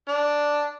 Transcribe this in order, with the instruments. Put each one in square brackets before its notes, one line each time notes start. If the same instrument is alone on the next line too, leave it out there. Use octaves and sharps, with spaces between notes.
[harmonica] D4